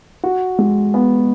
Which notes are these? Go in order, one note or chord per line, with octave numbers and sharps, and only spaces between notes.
F#4
G#3
B3